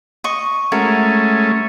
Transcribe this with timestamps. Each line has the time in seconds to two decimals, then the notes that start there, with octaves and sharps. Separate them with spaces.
0.24 D#5 C#6
0.72 G#3 A3 C#4 E4 F#4 A#4